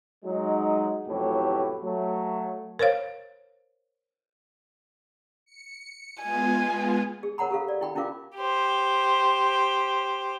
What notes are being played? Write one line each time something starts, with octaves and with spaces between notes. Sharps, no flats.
F#3 G#3 D#4
A1 F2 A2 C3 F#3 G4
F#3 A3
A#4 C5 C#5 F5
C#7
G#3 B3 F4 G#5
G#4
A#4 C#5 F#5 A#5 B5
G4 A4 F5
D5
E4 G5 B5
C#4 E4 F4 A#4 F5 D6
G4 C5